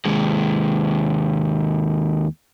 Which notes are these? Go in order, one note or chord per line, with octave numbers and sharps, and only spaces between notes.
D#2 G#3